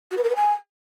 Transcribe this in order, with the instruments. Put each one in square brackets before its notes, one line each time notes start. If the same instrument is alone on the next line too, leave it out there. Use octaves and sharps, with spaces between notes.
[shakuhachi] F#4
B4
A#4
B4
G#5